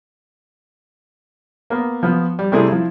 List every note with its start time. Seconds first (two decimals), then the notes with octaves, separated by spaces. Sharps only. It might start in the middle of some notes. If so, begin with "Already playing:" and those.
1.70 A#3 B3
2.03 F3 B3
2.39 G3
2.52 C3 G3 A3 C4 E4 G#4
2.68 F3 E4